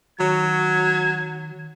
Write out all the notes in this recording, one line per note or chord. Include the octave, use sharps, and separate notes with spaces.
D#3 F#3 F#4 C#5 G#6